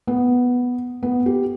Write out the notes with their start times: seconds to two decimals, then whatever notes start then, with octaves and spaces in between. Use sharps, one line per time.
0.07 B3
1.03 B3
1.26 G4